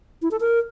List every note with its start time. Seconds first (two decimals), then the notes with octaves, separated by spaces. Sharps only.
0.22 E4
0.31 A4
0.40 A#4